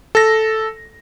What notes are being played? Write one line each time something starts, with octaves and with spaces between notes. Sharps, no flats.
A4 A#6